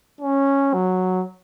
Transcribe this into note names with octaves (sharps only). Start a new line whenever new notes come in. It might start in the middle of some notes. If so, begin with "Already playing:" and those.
C#4
F#3